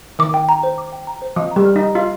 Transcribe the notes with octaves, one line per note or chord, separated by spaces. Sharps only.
D#3 D6
G5
A#5
C5
D6
G5
A#5
C5
F3 D#5
G3 A#5
F6
D#4 D#5
F4 D#5